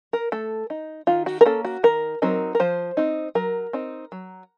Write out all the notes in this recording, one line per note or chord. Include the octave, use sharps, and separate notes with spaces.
A#4
A3 A4
D#4
D#3 F4
F#4
A#4
A#3 C#4 A4
F#4
D#3 A#4
F#3 C4 D#4 A#4
A#4
F3 C5
C4 D#4
F#3 A#4
C4 D#4
F#3